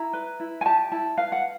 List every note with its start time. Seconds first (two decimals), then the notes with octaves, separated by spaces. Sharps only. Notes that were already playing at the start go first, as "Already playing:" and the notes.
Already playing: E4 A#5
0.13 B4
0.40 E4
0.61 G#5
0.66 G4 A5
0.92 E4 A5
1.18 B4 F5
1.32 F#5